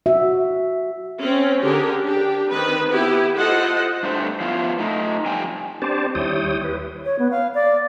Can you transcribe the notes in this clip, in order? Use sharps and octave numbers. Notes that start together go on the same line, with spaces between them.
F#4 E5
C4 C#4
D3 G4 G#4 A#4
D4 G4
D#3 C4 B4
B3 E4 G4
F4 A4 C5 D#5 F#5
G2 A3 C5
F3 B3 E4 F4
A3 D#4
F2 F3 G3 G5 G#5
C4 D4 G4 C5 D5 A5
D#2 G3 E4 C#5 G5 D#6
B4
C#5
B3
F5
D5